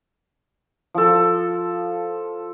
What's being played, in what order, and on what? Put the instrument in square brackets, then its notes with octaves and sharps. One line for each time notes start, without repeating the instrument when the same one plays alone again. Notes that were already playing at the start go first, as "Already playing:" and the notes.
[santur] F3 A4